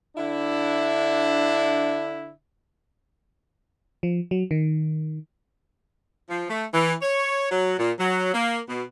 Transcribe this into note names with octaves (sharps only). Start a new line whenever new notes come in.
D3 D4 E4
F3
F#3
D#3
F3
A3
E3
C#5
F#3
A#2
F#3
A#3
B2